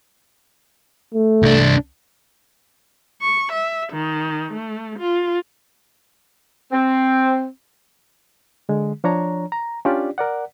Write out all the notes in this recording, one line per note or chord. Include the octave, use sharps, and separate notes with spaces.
A3
C2 D4
C#6
E5
D#3
A3
F4
C4
D3 G#3
F3 D4 C#5 A#5
A#5
C#4 D4 F4 G4 D5
A#4 D5 F#5